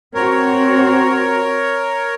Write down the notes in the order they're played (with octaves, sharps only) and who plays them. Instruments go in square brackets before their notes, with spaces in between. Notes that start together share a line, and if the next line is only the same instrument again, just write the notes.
[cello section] C4 F#4 [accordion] A#4 C#5